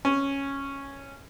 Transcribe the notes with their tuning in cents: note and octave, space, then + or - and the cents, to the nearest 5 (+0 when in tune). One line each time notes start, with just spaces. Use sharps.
C#4 -5 G#5 +0